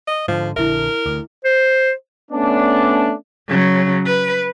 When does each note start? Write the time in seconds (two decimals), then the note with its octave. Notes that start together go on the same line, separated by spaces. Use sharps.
0.07 D#5
0.28 G#2 D3 F3
0.56 A#1 D3 E4 A#4 E5
1.06 D2
1.45 C5
2.31 A3 B3 C#4 D4
3.48 C#3 F#3
4.05 B4